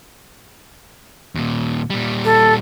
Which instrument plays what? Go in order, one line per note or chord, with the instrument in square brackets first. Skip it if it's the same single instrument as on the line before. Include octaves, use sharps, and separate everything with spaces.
[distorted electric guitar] D#2 A#2
A#2 G3
[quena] A4